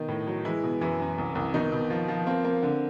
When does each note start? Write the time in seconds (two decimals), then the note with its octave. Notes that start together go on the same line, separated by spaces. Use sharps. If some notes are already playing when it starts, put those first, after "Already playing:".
Already playing: B2 D#3 D#4
0.09 A2
0.27 F#3
0.45 E3 G#3 E4
0.63 B2
0.81 F#2 E3 E4
1.00 F#2
1.18 C2
1.35 C2
1.54 B2 D#3 D#4
1.72 B2
1.90 F3
2.08 F3
2.27 A#3 C4
2.45 A#3
2.63 D3